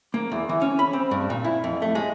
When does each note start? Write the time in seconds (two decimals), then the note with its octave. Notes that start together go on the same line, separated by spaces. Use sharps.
0.14 A#3
0.32 E2
0.49 E3
0.62 C#4
0.79 B5
0.93 C4
1.11 G2
1.30 A#2
1.44 E4
1.64 F2
1.82 A3
1.95 G#3